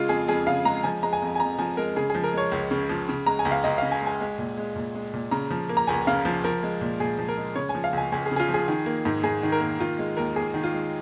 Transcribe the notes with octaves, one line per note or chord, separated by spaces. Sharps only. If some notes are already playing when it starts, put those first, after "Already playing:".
Already playing: C#3 G#3 F4
F2 G#4
F2 G#4
C#3 F5
G#3 A#5
F3 G#5
G#3 A#5
G#5
F2
G#5
F2 A#5
F3 G#5
G#3 A#4
C#3 G#4
F3 G#4
A#4
G#3 C#5
C#2
C#3
F3
C#3
G#3 A#5
G#5
C#2
F5
C#2 D#5
C#3 F5
G#5
G#3 G#5
G#3
A#2
G#3
A#2
G#3
A#2
C#3 A#5
F3
A#3
A#5
C#2 G#5
C#3 F5
F3
F3 A#4
G#3
A#2
A#2 G#4
F3
A#4
G#3
C#3 C#5
G#5
F3
F5
C#2 G#5
C#2 G#5
G#4
C#3
G#4
F4
F3
G#4
D#3
A#3
G#2
G#2 G#4
D#3
A#4
A#3
D#3 F4
G#3
D#2 A#4
D#2 G#4
D#3
F4
G#3